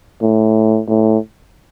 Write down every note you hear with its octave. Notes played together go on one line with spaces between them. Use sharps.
A2
A2